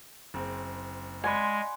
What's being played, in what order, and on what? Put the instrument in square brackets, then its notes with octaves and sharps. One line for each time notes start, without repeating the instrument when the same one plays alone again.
[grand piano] F#1 C4
[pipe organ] G#3 [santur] D5 F#5 C6 [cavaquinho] G#5 B5